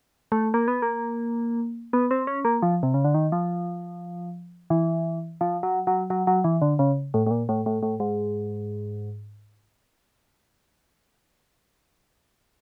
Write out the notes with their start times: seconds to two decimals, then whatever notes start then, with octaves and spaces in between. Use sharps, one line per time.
0.32 A3
0.54 A#3
0.68 B3
0.82 A#3
1.93 B3
2.11 C4
2.27 C#4
2.45 A#3
2.62 F3
2.83 C3
2.94 C#3
3.04 D3
3.14 D#3
3.32 F3
4.70 E3
5.41 F3
5.63 F#3
5.87 F#3
6.10 F#3
6.27 F#3
6.44 E3
6.62 D3
6.79 C#3
7.14 A2
7.27 A2
7.31 A#2
7.49 A2
7.66 A2
7.83 A2
8.00 G#2